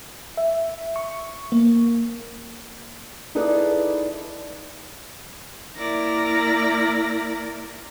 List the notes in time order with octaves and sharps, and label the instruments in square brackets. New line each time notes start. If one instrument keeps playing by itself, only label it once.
[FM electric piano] E5
C#6
A#3
[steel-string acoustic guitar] D#4 E4 G#4 A4 B4 D5
[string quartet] A#3 E4 A#4 D5 A#6